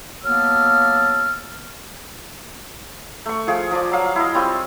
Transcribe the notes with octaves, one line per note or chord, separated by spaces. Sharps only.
F#3 A#3 B3 A5 E6 F6
A3 C#6
F3 G#4 F5 G5
F3 D5
F#3 F5
E4 D#5
G3 C4 F4 C#6